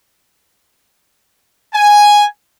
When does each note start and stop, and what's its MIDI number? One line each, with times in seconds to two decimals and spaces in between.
1.74 2.24 80